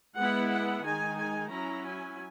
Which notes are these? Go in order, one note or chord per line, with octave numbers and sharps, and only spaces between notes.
G#3 B3 E4 F#5
F#5
D#3 G#3 D#4 G#5
G#5
F#3 C#4 E4 A#5
G#5